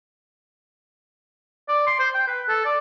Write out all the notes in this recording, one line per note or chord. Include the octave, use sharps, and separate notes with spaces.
D5
C6
C5
G5
B4
A4
D5